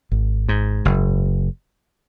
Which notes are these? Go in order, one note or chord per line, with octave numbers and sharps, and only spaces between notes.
G#1
G#2
F#1